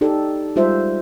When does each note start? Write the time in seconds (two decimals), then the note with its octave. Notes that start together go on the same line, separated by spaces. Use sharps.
0.01 D#4 G4 A4 D5
0.56 G3 G#3 F4 C5 E5